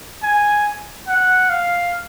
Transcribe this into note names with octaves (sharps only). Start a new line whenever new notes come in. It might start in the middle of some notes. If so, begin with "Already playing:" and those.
G#5
F#5
F5